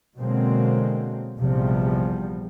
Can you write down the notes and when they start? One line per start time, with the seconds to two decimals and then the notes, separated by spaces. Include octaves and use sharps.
0.17 B2 D3 F#3 G#3 A#3 C4
1.39 A#1 E2 C3 F3 G3 B3